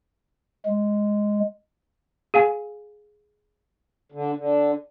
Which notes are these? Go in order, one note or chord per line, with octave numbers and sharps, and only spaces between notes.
G#3
G#4 F5 G#5
D3
D3